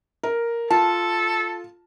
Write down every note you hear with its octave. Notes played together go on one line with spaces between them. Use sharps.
A#4
F4 A4 A5